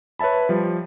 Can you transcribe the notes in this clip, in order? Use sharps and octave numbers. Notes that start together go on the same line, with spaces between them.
B4 C#5 E5 A5 B5
F3 G3